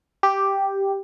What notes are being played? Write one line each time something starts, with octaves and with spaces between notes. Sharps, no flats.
G4